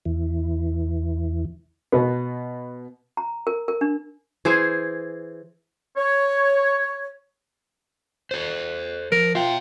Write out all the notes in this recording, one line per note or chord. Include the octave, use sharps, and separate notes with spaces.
E2 E3
B2 B3
A#5
A#4
A#4
D4
E3 G#4 C5
C#5
A4 C5
F3 A#4
F4 E5 G5